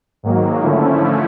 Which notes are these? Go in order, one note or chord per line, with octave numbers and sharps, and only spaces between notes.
G#2 D#3 F#3 A#3
D3 F3 A3 C#4 E4